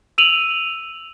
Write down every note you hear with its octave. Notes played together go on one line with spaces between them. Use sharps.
E6 D#7 F7 F#7